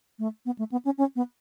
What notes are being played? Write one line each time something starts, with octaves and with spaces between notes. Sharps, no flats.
A3
B3
A3
B3
C#4
C#4
B3